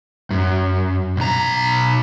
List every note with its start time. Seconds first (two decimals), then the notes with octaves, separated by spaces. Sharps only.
0.31 F#2
1.17 B1 A#5